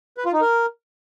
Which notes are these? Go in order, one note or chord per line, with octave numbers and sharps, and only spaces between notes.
B4
F4
D#4
A#4